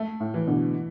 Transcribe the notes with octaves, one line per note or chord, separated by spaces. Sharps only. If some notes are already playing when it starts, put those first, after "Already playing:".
Already playing: A3
A2
E3
B2 D3